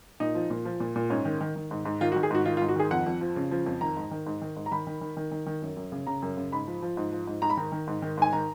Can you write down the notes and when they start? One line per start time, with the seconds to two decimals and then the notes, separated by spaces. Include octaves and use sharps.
0.20 A#2 D#4
0.35 F3
0.50 A#2
0.65 F3
0.80 A#2
0.96 A#2
1.10 G#2 C#4
1.25 D#3
1.41 D#3
1.56 D#3
1.71 G#2
1.85 G#2
2.01 D#3 F4
2.12 F#4
2.16 D#3
2.23 G#4
2.31 G#2 F#4
2.45 D#3 F4
2.57 F4
2.62 G#2
2.69 F#4
2.76 D#3 G#4
2.91 F2 F#5
3.06 F2
3.21 F3
3.36 C#3
3.51 F3
3.66 F2
3.81 D#3 A#5
3.97 G#2
4.11 D#3
4.26 G#2
4.41 D#3
4.56 G#2
4.66 A#5
4.71 D#3 B5
4.87 D#3
5.01 D#3
5.17 D#3
5.31 D#3
5.46 D#3
5.62 F#2
5.77 F#2
5.92 C#3
6.07 C#3 A#5
6.22 F#2
6.37 C#3
6.52 G#2 B5
6.67 F3
6.82 F3
6.97 G#2
7.12 F3
7.27 G#2
7.42 G#2 A#5
7.50 B5
7.57 D#3 A#5
7.72 D#3
7.87 G#2
8.02 D#3
8.17 G#2 G#5
8.33 D#3 A#5